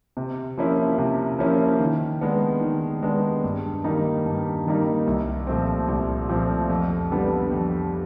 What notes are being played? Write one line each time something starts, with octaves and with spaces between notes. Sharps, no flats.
C3
F3 A#3 C#4 E4
C3
F3 A#3 C#4 E4
D#3
G#3 B3 D4
D#3
G#3 B3 D4
G2
D#3 G3 A#3 D#4
G2
D#3 G3 A#3 D#4
C2
A#2 F3 A3 C4
C2
A#2 F3 A3 C4
F2
D3 G3 B3 D4
F2